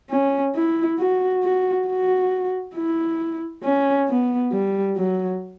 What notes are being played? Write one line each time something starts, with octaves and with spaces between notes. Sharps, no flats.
C#4
E4
F#4
F#4
F#4
E4
C#4
B3
G3
F#3